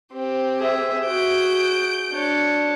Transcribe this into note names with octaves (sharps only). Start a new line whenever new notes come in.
C4 G4
G#4 E5
F#4 G#4 G6 D7
D4 C#5